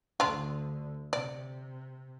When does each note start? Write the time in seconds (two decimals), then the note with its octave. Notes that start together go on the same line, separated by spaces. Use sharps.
0.20 D2 D3 D4 F4
1.13 C3 D5